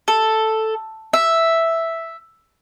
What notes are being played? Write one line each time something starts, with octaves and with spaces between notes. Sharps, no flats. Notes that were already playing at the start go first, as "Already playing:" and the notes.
A4
E5